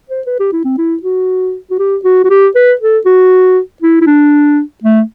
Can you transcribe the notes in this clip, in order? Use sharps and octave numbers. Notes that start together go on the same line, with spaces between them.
C5
B4
G4
E4
C4
E4
F#4
F#4
G4
F#4
F#4
G4
B4
A4
F#4
E4
E4
D4
A3